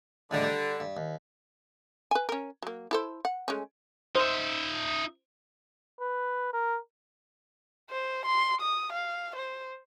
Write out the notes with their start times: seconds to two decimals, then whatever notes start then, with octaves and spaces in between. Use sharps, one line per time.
0.31 C#2 A2 D3 G3
0.43 G3
0.80 G2
0.97 D#2
2.11 B4 G#5
2.29 C#4 A#4
2.62 F#3 A#3
2.91 E4 A4 C5
3.25 F#5
3.48 G#3 A3 C#4
4.16 D#4 C5 E5
6.01 B4
6.53 A#4
7.90 C5
8.26 C6
8.61 D#6
8.92 F5
9.36 C5